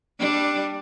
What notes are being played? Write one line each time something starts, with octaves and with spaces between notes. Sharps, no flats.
G3 D4